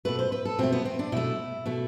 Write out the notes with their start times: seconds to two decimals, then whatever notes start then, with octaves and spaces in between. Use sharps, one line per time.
0.05 B2 A3 B4
0.19 C5
0.32 B4
0.45 A4
0.59 B2 A3 C4
0.72 B3
0.85 C4
0.99 D4
1.12 B2 A3 E4
1.66 B2 A3